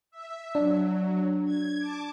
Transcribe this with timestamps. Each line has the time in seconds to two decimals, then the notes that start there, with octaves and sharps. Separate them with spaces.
0.11 E5
0.55 F#3 D4
1.45 G#6
1.78 A5 D6